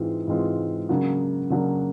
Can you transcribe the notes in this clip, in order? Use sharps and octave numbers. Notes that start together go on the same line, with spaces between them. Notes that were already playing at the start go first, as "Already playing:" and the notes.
Already playing: G#2 E3 G#3 C4 F4
G#2 E3 G#3 C4 F4
C#3 F#3 A#3 D4 F#4
C#3 F#3 A#3 D4 F#4